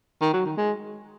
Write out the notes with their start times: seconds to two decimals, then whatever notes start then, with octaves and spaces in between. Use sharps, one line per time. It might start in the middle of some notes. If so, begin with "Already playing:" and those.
0.21 D#3
0.33 F#3
0.45 D#3
0.57 G#3